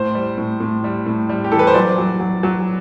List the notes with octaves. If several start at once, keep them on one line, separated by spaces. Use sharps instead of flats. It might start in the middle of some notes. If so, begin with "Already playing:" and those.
Already playing: A2 C5
G3
A2
A2
G3
A2
G3
G4
E3 A4
B4
C5
F#3 D5
F#3
F#3
F#3